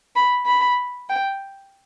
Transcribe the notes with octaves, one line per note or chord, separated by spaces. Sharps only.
B5
B5
G5